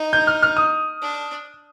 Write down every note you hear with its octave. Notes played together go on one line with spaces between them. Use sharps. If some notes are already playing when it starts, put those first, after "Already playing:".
Already playing: D#4
G6
F6
F6
D#6
D4